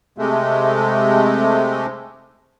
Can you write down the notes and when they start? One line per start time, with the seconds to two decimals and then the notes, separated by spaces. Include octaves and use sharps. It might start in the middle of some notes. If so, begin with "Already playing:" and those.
0.18 C3 G#3 A3